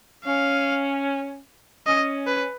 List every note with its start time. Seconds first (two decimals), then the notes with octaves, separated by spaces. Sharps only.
0.25 C#4 F5
1.87 C#4 D#5
2.27 B4